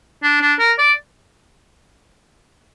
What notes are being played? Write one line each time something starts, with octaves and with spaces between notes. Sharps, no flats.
D4
D4
A#4
D5